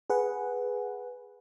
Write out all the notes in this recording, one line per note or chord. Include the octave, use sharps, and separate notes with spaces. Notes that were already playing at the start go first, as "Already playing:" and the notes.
G#4 B4 F#5